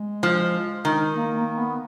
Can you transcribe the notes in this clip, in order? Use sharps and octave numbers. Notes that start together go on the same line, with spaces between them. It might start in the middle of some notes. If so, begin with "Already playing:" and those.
Already playing: G#3
F3
D#3
A#3
A#3
B3